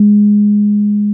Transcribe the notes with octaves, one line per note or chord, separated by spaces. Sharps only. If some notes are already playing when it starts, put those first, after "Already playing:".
Already playing: G#3